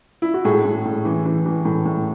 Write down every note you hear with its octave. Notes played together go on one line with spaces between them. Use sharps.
E4
F#4
A2 G#4
A2
A2
E3
E3
E3
A2
A2